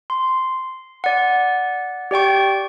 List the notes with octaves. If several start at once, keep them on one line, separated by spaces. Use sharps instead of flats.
C6
D5 F#5
G4 D5 G5 C#6